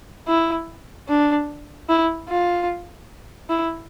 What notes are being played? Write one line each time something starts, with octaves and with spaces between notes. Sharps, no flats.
E4
D4
E4
F4
E4